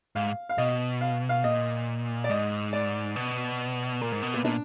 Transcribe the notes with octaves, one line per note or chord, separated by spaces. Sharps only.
G#2 F5
F5
B2 D#5
F5
F5
A#2 D#5
D5
G#2 D#5
D5
B2
A#2 A#4
G#2
B2
A#2 B3
A#2 D4